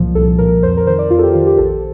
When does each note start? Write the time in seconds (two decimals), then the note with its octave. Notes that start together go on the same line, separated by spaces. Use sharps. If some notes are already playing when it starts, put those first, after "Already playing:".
Already playing: C2 A#2 F3
0.15 C2 A4
0.39 A#2 F3 A#4
0.63 F2 C5
0.77 A#4
0.87 D#3 C5
0.99 D5
1.10 F2 F4
1.19 A4
1.23 G4
1.34 D#3 F4
1.47 G4
1.58 A#1 A4